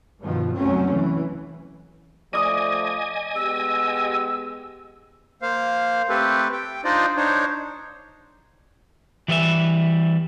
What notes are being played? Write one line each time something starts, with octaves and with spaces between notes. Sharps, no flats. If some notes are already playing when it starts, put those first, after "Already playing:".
G2 B2 D#3 F3
F#1 C2 F#3 A3 C4 C#4
E3
F3 A3 D5 D#5 G#5 D#6
G#3 B3 G4 E6
A#3 C5 F5
A3 C4 G4 A4 B4
G5
D4 D#4 F4 C5 D5 D#5
D4 D#4 C5 C#5
E3 G3 B4 D#5 E5